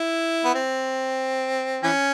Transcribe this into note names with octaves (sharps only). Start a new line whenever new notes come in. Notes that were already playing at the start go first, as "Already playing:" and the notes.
Already playing: E4
B3
C4
E3 C#4